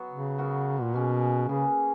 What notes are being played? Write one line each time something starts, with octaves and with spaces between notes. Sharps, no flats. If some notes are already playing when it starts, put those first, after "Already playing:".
Already playing: F#3 B3 F#4
C#3
F#3 B3 F#4 A#4
A#2
B2 A#3 C#4 G#4
C#3 A#3 C#4 G#4 B4